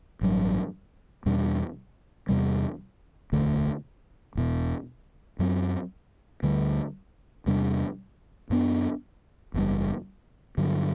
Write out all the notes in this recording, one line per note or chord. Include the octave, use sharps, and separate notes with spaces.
A1 G2 F#3
E2 B2 G3 D4
E2 C3 G3
E1 D2 D3 A3
E1 E2 B2
F#2 F#3 C4
D2 D3 G3
E2 C3 G3 D4
F#2 F#3 B3 D4
F#1 E2 B2 G3
G2 D3 F#3